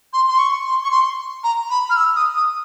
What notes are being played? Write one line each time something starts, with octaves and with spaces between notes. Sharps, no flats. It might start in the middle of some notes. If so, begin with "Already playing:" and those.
C6
C6
C#6
C6
C#6
C6
A#5
B5
F6
E6
D#6
D#6